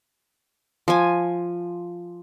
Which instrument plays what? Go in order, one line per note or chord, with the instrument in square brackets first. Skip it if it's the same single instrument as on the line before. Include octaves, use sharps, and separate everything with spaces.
[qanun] F3 G#5